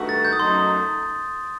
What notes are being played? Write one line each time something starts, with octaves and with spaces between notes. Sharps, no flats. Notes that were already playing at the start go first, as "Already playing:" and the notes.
Already playing: G2 D#3 A3 D#4 F#4
A6
G6
D#6
F#2 F#3 A3 D#4 C6